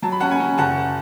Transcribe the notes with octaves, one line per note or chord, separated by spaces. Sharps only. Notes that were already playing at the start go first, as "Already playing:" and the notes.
F#3 A5
B5
C#4 F#5 A5
G#5 B5
C#4
F#1 F#5 A5